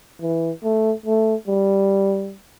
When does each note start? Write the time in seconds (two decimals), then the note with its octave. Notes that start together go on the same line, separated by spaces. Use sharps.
0.22 E3
0.64 A3
1.06 A3
1.48 G3